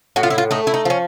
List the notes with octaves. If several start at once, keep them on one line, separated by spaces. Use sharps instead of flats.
A2 F#4
F4
E4
F4
A3 D#4
E4
D#4
F3 C#4